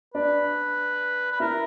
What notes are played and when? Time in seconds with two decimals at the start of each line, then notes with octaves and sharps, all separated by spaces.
0.14 D4 B4 D5
1.32 B4
1.40 E4 A#4 E5